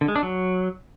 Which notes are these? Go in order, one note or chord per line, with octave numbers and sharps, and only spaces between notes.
D3
G#3
D4
F#3